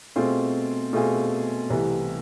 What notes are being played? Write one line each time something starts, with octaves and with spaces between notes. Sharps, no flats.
B2 A3 C4 F4 G#4
B2 A3 C4 F4 G#4
C2 C3 E3 A3